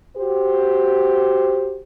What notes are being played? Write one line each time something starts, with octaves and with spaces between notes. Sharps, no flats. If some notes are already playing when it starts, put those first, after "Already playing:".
F#4 G4 C5